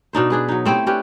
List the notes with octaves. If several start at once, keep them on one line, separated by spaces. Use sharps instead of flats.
B2 D4 D#4 C5
D4 G#4 B4
F#3 D#4
A3 C4 E4 G4
C#4 D4 G4 B4